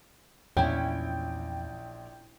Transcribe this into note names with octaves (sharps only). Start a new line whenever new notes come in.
A#1 E2 F3 C#4 E4 G5